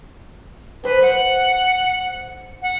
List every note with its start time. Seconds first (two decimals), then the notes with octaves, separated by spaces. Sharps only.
0.84 D#2 B4 C5
1.02 C5 F#5
2.62 F#5